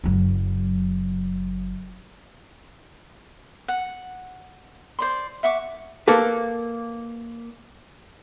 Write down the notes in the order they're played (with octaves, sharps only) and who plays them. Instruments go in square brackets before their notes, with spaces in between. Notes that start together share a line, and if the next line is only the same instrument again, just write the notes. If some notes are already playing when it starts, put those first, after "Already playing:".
[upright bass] F#1 F#3
[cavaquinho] F#5
C5 D5 C6
E5 F#5 C#6 D6
[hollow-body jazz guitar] A#3 A4 B4